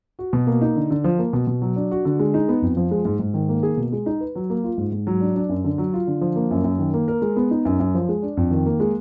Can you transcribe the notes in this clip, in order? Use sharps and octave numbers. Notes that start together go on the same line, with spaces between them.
F#4
B2
A#3
D#4
D3
D3
F3
A#3
B2
B2
F#3
D4
F#4
D3
G#3
D#4
B3
F2
F3
G#3
G#2
G#2
D#3
A#3
G#4
B2
G#3
D#4
B4
F#3
A#3
F4
G#2
G#2
F#3
D4
D4
F#2
D3
F#3
F4
D3
F3
A#3
F#2
F#2
D#3
A#3
A#4
G#3
B3
D#4
F#2
F#2
F3
G#3
D4
F2
D#3
A#3
G#3